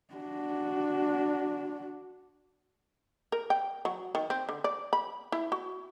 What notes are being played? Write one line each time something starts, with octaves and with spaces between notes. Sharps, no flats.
D4 F#4
A#4
G5
F#3
D#3
C4
D3
D5
B5
E4
F#4